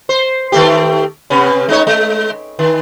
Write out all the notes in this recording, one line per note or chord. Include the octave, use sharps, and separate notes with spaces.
C5
D#3 A3 G4
C3 B3 C#4
G#3 D#4 C#5
G#3
D#3